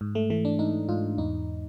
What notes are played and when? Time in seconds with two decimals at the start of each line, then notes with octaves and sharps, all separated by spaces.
0.01 G#2
0.15 A3
0.30 E3 A3
0.45 D4
0.59 G#2 D#4
0.89 G#2 F4
1.18 E2 D#4